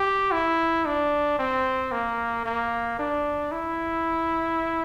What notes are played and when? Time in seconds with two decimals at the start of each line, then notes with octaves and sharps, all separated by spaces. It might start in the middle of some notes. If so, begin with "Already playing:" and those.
Already playing: G4
0.32 E4
0.86 D4
1.39 C4
1.92 A#3
2.46 A#3
2.99 D4
3.52 E4